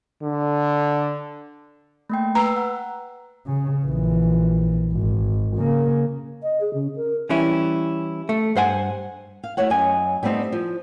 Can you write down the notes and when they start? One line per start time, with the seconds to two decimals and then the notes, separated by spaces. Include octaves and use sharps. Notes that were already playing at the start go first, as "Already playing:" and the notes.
0.22 D3
2.10 A3 A#3 G5
2.35 B4 A#5 E6
2.56 F#5
3.46 C#3
3.85 A#1 E3
4.93 G#1
5.57 C#3 A#3
6.43 D#5
6.61 G#4
6.74 C#3
6.96 A#4
7.29 E3 G3 C#4 E4
8.29 A3
8.56 G2 C5 F#5 G#5
9.44 F5
9.57 A3 E4 F#4 C#5 F#5
9.70 F#2 D#5 G#5
10.23 G3 A3 B3 C4 D#4
10.52 F3